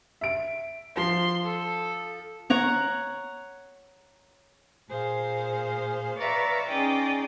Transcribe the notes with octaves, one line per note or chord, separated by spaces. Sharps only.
E5 D7
F3 C6
A4
C#5 F#5 A#5 C#6
A#2 G#4 C5 F5
B4 C#5 D5 E5 F5 A#5
C#4 D#4 G#4 D5 D#5 G5